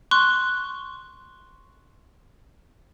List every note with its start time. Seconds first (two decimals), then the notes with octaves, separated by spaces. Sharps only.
0.11 C6 C#6 F#6